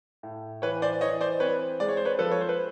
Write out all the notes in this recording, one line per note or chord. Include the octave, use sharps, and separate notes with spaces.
A2
E3 B4 C#5
C5 D5
E3 C#5 D#5
C5 D5
C4 B4 C#5
G#3 D5
C#5
C5
B4 C#5
F3 A4 B4
C#5
C5
B4